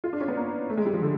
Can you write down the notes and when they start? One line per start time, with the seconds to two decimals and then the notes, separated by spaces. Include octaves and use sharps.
0.04 F4
0.13 D4
0.21 C#4
0.28 B3
0.37 A#3
0.70 A3
0.77 G#3
0.86 G3
0.93 F3
1.02 D3